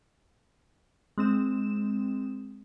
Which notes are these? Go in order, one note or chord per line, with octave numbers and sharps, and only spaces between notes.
G#3 C4 E7